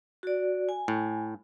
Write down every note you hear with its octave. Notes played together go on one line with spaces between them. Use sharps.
F#4 D5
G#5
A2